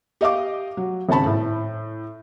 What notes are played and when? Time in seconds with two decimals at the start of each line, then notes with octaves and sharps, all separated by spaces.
0.21 G4 D#5 F5 D6
0.77 F#3
1.09 G#1 C#3 C4 A5 B5
1.26 A2